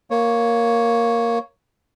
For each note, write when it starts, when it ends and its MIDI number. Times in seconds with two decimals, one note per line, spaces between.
0.10 1.39 58
0.10 1.39 73